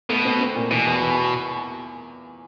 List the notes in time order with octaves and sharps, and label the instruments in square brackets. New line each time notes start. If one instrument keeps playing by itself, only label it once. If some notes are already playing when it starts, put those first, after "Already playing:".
[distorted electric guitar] B2 [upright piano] A3
[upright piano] C4
C4
A#2
[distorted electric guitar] B2 [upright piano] E3
[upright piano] E2
E3